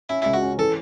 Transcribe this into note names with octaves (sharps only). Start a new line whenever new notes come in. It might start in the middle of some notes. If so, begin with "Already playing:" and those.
C#4 E4
C#2 E4
F#4
C#4
E3 A4